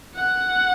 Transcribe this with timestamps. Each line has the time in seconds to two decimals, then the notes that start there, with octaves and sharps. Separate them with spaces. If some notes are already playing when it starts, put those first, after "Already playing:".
0.15 F#5